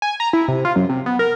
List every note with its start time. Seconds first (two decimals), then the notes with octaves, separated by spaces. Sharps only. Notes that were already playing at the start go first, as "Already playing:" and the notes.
0.02 G#5
0.20 A#5
0.33 E4
0.48 C3
0.65 F4
0.76 F#2
0.89 C3
1.06 B3
1.19 A#4